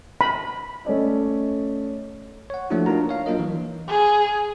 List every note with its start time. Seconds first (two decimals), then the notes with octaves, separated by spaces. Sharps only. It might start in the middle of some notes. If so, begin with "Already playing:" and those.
0.21 B5
0.85 A3 C#4 D5 D#5
2.50 C#5 F#5
2.70 F3 A3 A#3 D4 E4 F#4
2.86 D4 D#4 F4 A#4 A#5
3.09 C#5 F5
3.26 F#3 A#3 D4 F4 A#4 D#5
3.39 E3
3.89 G#4